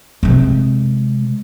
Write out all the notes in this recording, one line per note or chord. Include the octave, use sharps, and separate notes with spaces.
C3 G#3